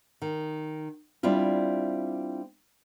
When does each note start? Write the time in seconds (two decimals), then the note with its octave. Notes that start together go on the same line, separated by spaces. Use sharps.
0.22 D#3
1.23 G3 C4 D4 E4 F4